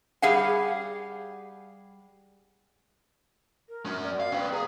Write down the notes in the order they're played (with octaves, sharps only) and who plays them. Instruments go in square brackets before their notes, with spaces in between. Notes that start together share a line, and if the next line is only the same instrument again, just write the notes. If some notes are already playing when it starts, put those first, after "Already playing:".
[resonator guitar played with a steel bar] G3 G4 G#4 F5 F#5
[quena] A#4
[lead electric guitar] C#4 F#4
[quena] D5
[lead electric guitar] F5
[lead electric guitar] C#4 B4 [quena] G5
[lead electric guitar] G#4 [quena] A#5